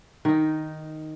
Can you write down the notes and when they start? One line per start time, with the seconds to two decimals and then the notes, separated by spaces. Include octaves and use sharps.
0.25 D#3 D#4